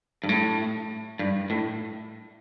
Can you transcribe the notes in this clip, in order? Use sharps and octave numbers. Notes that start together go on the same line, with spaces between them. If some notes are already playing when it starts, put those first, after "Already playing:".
G2
A2
G2
A2